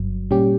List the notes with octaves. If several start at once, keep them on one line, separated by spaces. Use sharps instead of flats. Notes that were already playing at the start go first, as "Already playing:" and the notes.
Already playing: G1 G2 F#3
A#2 G3 C#4 G4